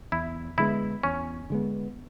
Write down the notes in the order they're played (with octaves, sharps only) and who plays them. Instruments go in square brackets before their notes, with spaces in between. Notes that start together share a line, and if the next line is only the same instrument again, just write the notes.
[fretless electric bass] E2 [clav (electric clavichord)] E4
[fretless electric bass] D3 G#3 B3 [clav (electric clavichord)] E4
[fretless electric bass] E2 [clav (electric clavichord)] C#4
[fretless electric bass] D3 G#3 B3